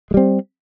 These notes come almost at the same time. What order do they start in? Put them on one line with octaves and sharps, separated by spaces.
G#3 G3 C4